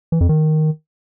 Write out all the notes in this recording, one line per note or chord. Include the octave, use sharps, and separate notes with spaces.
E3
F2
D#3